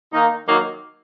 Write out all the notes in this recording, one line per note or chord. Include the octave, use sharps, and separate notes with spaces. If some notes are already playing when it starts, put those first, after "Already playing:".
D#3 A#3 D#4
D#3 F#3 A#3 D#4